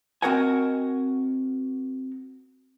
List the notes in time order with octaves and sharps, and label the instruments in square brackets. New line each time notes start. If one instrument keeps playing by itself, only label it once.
[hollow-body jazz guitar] C4 F#4 A#4 D#5 F#5 G#5